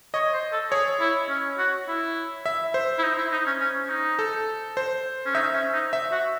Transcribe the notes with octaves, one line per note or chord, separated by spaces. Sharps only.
C#5 D#5
C5
A4
G#4 C#5
E4
C#4
F#4
E4
E5
C5
E4
D#4
E4
D#4
C#4
C#4
C#4
D#4
A4
C5
C#4
D#4 E5
C#4
D#4
E5
F#4